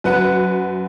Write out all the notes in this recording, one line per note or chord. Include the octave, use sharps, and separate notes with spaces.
F#2 B4 F#5